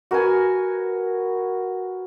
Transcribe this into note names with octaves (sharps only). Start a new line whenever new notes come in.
F#4 A#4 B4 G#5